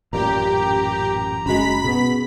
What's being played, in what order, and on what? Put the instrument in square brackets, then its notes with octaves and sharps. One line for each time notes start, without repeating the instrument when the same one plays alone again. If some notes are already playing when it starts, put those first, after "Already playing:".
[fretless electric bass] A1 F#2 A#2 [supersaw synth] G4 [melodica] A#5
[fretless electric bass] F#1 G#3 [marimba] C#4 F#4 [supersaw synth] B5 B6
[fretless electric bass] B2 B3 [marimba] G#4